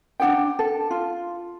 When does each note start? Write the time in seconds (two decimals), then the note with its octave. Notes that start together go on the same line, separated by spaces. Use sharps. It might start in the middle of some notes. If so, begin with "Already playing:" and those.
0.20 D4 G#4 F#5 G5
0.59 A4
0.91 F4